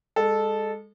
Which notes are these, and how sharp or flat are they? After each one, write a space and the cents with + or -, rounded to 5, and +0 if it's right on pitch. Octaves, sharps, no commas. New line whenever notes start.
G#3 -30 A4 -10